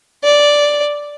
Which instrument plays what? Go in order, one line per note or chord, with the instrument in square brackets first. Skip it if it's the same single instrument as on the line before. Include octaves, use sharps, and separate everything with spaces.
[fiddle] D5